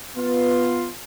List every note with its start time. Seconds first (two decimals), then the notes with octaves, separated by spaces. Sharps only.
0.17 B3 F4